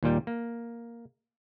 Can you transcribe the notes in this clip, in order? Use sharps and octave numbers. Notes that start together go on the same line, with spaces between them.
D#2 A#2 G3 G5
A#3